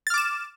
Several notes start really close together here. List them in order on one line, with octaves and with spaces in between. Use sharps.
A6 F6 D6 E7